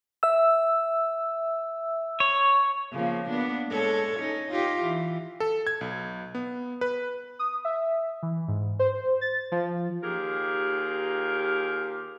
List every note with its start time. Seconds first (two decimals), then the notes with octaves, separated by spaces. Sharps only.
0.23 E5 E6
2.20 C#5
2.92 C#3 F3 A#3
3.29 A#3 B3 D4
3.70 G#3 A4 C#5
4.17 C#4 D#4
4.50 D#4 F4 G4
4.83 E3
5.40 A4
5.67 G#6
5.81 B1
6.35 B3
6.81 B4
7.39 D#6
7.65 E5
8.23 E3
8.48 G#2
8.79 C5
9.21 A6
9.52 F3
10.03 D#2 F4 G4 G#4 A#4